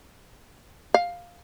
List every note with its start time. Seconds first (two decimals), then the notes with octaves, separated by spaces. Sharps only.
0.94 F5